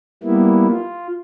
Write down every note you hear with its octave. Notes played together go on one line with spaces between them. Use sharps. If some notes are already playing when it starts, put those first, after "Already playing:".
G3 A#3 B3 E4
F4